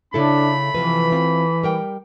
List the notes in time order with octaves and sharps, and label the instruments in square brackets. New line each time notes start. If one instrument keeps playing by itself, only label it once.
[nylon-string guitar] C#3 E4 A4 [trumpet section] A3 B5 [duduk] D4
[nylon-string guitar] C3 F3 B4 [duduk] E3
[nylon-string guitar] C4 F4
G3 A#4 G5